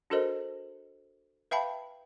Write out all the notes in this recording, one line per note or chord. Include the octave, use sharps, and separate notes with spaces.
D4 F#4 A4 A#4 C5 D#5
B4 E5 F5 G5 A5 B5